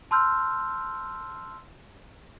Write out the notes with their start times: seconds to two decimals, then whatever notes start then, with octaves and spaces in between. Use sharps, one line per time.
0.11 A5 C6 E6 F6 G6